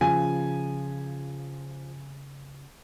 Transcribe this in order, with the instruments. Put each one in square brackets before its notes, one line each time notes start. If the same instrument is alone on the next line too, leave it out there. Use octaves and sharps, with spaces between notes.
[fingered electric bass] C#3 [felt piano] F3 [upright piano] G#5